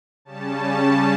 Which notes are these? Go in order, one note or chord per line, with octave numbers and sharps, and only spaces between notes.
C#3 G3 C#4 A5